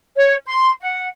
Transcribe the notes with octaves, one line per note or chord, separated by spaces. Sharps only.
C#5
C6
F#5